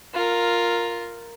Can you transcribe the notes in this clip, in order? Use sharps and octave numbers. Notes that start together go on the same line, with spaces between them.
F4 A#4